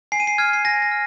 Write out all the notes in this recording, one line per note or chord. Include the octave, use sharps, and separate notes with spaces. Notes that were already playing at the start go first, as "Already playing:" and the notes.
G#5 C7
D#7
C7
F6 G#6
C7
G#5 A#6
A#6
F6